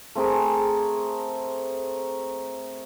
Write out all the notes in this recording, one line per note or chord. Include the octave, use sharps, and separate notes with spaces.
A3 C4 G#4 A#4